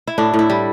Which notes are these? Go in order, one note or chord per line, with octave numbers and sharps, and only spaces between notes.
E4
A2 D4
A2
E4
G3